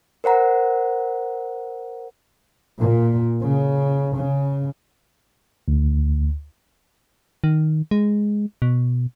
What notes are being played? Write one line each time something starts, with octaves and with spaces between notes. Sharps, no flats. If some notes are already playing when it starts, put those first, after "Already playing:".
A#4 C5 F#5 A#5
A#2
C#3
C#3
D2
D#3
G#3
B2